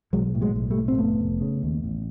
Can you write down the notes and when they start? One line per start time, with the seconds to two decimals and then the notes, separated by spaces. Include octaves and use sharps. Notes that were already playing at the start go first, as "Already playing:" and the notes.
0.13 B1 F#3 G#3
0.35 A2
0.41 F#3 G#3
0.56 B1
0.70 G3 A3
0.78 A2
0.88 C4
0.98 F1 A3 B3
1.20 F1
1.41 C#3
1.63 D#2
1.84 A1